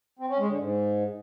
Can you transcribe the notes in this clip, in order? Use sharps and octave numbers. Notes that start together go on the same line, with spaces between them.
C4
C#4
G#3
D3
G#2